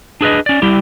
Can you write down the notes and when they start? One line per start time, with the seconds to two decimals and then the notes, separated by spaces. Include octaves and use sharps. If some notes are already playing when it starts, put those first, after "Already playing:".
0.21 D4 G#4 B4 D#5
0.46 C#4 D5
0.62 G3 E4 G4